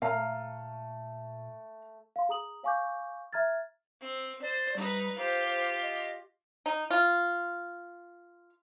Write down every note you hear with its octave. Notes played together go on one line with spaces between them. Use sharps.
A#2 A3 F5 A#5
F5 C6
G#4 A#5 D#6 F#7
C#5 F5 G#5 C#6 D6 G6
E5 A#5 F6 G#6 A6
C4
C5 D5
G3 D#4 B4
F4 G4 C5
C5
D#5
D#4
F4